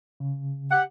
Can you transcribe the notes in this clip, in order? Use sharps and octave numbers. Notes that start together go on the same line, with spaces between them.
C#3
G4 F#5